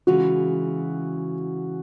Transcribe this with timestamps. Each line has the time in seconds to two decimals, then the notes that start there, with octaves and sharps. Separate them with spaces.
0.07 C#3 E3 G#3 F#4